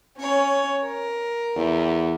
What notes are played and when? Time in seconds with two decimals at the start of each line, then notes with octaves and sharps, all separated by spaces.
0.20 C#4 C#5
0.85 A#4
1.56 E2